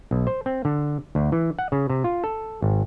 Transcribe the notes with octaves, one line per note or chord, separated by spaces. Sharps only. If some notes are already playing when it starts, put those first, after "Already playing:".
B1
C5
C4
D3
D2
E3
F#5
C#3
C3
F4
A4
G#1